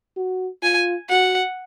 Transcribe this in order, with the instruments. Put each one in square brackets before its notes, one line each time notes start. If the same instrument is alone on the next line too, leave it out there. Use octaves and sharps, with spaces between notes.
[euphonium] F#4
[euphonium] F4 [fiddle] G#5
[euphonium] F#4 [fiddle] F#5